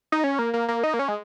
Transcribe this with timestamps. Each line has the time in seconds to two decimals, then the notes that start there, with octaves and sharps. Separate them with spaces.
0.12 D#4
0.24 C#4
0.39 A#3
0.54 A#3
0.68 A#3
0.83 D#4
0.94 A#3
0.99 C#4
1.08 G#3